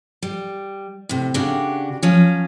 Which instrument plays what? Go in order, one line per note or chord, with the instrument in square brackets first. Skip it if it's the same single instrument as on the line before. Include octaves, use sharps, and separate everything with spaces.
[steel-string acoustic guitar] G3
A2 C3
C#3 D4 F#4 G4
F3 F#3 C#4